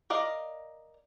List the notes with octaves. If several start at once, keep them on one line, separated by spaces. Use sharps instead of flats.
A#4 D5 D#5 F5